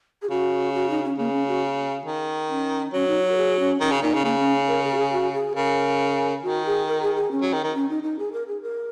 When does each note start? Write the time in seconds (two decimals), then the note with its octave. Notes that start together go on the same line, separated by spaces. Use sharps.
0.22 G#4
0.30 C#3 F#4
0.74 F#4
0.90 D#4
1.04 C#4
1.18 C#3 A#3
1.32 C#4
1.47 F#4
2.05 D#3
2.49 C#4
2.93 F#3 C#4
3.07 D#4
3.23 F#4
3.31 A#4
3.37 G#4
3.59 C#4
3.80 D#3 C#4
3.92 C#3
4.02 A#2 D#4
4.14 C#3
4.24 C#3 A#3
4.39 C#4
4.68 A#4
4.84 G#4
4.94 F#4
4.98 G#4
5.12 F#4
5.33 G#4
5.56 C#3 A#4
6.43 D#3 F#4
6.66 G#4
6.87 A#4
7.02 G#4
7.16 G#4
7.31 C#4
7.42 F#3
7.53 D#3
7.63 D#3
7.75 C#4
7.90 D#4
8.03 D#4
8.19 G#4
8.33 A#4
8.48 G#4
8.62 A#4